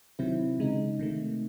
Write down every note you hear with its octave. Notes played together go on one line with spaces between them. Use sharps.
C3 D#3 F#3 C4 E4
C#3 G#3 D#4
C3 D#3 A3